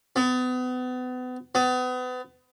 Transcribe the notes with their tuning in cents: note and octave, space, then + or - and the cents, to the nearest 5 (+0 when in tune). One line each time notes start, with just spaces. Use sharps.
B3 +35
B3 +35